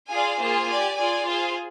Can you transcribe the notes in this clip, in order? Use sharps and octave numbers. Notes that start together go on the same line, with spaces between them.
F4 G#4 D5 F5 G#5
A#3 F4 G#4 C5
G4 D5 G#5
F4 G#4 D5 G#5
F4 G#4 C5 F5